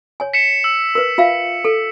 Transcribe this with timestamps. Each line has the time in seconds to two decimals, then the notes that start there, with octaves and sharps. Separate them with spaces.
0.20 C#5 G#5
0.34 B6 C#7 E7
0.64 E6
0.95 A#4 B4
1.18 F4 E5 F5
1.65 A4